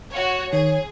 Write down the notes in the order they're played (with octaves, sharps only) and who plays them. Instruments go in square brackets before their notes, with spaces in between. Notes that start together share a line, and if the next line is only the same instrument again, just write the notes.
[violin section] F#4 C#5
[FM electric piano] D#3 [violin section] G#4 [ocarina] C#5